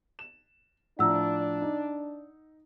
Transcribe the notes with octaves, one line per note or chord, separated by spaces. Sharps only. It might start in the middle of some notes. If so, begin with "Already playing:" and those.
E7
A2 F3 D4 D5 F#5 A#5 E6
D#4